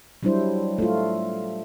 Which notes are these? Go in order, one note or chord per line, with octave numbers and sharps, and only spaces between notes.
F#3 G3 D4 E4 C5
A3 F4